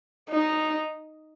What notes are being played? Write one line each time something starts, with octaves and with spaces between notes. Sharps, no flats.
D#4